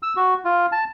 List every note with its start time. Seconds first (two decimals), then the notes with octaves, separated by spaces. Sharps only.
0.03 E6
0.16 F#4
0.45 F4
0.72 A5